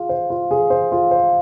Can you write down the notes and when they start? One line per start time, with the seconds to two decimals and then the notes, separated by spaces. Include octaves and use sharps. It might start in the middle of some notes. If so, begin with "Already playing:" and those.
Already playing: F4 G#4
0.09 C5
0.30 F4
0.51 G#4
0.70 C5
0.92 F4
1.11 C5